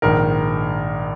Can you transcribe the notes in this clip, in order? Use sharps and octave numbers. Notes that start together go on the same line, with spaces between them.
A#1 G#2 D#3 A#4